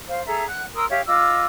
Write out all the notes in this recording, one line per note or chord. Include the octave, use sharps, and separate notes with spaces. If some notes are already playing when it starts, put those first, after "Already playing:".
C5 F5
G#4 A4 E5 A#5
F#5 F#6
A#4 C6 D#6 E6
G4 C#5 E5 F5
F4 D#5 D6 E6